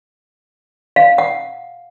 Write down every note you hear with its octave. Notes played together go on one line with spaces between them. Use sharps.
F5
F#5